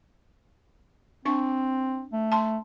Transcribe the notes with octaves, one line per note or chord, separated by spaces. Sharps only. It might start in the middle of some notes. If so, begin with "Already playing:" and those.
C4 D4 C#6
A3
A5 C6